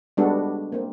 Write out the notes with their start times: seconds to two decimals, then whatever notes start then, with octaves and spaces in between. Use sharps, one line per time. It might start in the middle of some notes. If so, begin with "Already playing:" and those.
0.17 G3 G#3 B3 D4 F#4 A4
0.72 A#3 C4